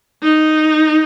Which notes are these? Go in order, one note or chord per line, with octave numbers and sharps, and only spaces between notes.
D#4